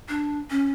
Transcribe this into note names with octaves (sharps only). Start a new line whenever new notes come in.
D4
C#4